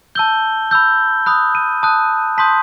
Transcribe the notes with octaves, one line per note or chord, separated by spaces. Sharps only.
A5 E6 G6 G7
B5 E6 G6
B5 D#6 F#6
D#7
A5 D#6 F#6
A5 C6 D#6 G6 B6